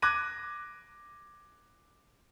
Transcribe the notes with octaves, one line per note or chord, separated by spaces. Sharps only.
D6 F#6 G#6 A#6 D#7